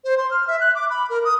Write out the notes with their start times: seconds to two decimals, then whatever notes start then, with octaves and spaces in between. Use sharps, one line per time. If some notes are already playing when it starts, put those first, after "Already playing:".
0.04 C5
0.18 C6
0.31 F6
0.47 E5
0.61 F#6
0.75 D6
0.90 B5
1.10 A#4
1.25 D#6